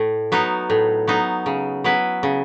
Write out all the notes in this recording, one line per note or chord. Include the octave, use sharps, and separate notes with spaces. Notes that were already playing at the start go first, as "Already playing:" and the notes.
Already playing: A2
F#3 B3 D#4
A2
F#3 B3 D#4
C#3
F#3 B3 E4 B4
C#3